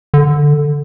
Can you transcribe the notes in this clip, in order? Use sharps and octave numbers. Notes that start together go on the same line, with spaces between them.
D3